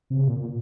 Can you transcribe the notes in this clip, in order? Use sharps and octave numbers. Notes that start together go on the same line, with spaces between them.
C3
C#3
A#2